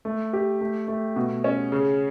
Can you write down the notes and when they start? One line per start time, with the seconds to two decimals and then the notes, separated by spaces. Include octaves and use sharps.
0.05 A3
0.33 G4
0.61 A3
0.88 A3
1.16 B2
1.44 C#4
1.72 C#3